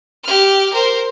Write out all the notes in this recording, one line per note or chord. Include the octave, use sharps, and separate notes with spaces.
G4 F6
A#4 C5